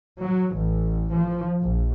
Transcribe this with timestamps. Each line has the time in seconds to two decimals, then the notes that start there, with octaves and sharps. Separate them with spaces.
0.21 F#3
0.54 A1
1.13 F3
1.61 A#1